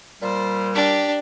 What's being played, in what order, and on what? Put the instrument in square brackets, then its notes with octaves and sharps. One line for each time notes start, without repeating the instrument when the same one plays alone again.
[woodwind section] A#2 G3 [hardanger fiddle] C5
[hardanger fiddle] D4 G4